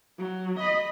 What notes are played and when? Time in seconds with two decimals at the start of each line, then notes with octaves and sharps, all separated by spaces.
0.18 F#3
0.59 D#5 B5